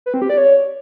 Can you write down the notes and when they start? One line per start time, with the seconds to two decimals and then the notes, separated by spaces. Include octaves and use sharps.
0.06 B4
0.14 C4
0.22 G4
0.30 D5
0.37 C#5